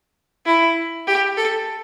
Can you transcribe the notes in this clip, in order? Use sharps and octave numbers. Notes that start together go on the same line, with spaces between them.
E4
G4
A4